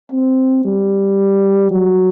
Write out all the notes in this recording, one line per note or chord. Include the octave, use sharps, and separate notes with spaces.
C4
G3
F#3